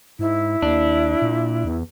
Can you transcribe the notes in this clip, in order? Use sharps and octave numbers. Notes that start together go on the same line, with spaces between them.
G#2 E4
D#2 D4
A#2
E2